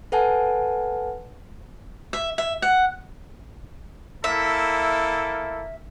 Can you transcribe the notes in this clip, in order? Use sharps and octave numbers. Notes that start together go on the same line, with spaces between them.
A4 B4 F#5 G#5 A5
E5
E5
F#5
A#3 E4 A4 E5